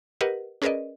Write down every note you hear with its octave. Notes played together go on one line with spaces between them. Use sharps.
G4 A#4 B4 D#5 F#5
C#4 G#4 A#4 B4 D5 D#5